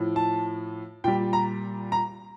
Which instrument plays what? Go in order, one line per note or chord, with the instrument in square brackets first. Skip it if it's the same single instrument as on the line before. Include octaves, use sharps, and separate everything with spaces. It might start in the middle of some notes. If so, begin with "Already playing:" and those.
Already playing: [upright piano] A2 F3
A5
A#2 G3 G5
A#5
A#5